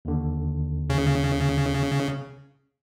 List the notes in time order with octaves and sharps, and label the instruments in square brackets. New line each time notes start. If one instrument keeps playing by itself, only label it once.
[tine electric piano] D#2 D3
[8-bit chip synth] C#3